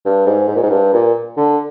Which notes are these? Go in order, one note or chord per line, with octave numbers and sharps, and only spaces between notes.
G2
G#2
G#2
A#2
G#2
G2
A#2
D3